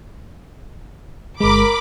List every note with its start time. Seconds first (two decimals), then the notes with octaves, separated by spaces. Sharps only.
1.41 G1 G#3 A#4 B5 D6